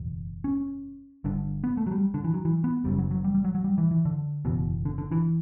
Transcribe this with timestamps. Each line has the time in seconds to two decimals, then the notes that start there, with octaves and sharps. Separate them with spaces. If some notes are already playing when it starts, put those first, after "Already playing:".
Already playing: F#1 E2 B2
0.44 C#4
1.24 G1 G2 D3
1.64 B3
1.77 A3
1.87 F#3
1.92 G3
2.14 D3
2.24 E3
2.34 F#3
2.45 E3
2.64 B3
2.84 F#1 F#2 C#3 G3
2.99 F#3
3.11 F#3
3.24 G3
3.35 G3
3.45 F#3
3.55 F#3
3.64 G3
3.78 E3
3.91 E3
4.05 D3
4.45 F#1 E2 B2
4.85 D3
4.98 D3
5.12 E3